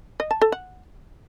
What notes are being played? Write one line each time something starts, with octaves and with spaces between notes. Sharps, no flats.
D#5
A5
A4
F#5